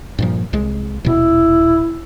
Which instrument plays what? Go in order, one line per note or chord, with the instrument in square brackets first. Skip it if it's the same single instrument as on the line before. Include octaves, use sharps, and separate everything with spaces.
[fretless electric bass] G2 A#2 F3
C2 G#3
[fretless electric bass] D#1 B2 [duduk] E4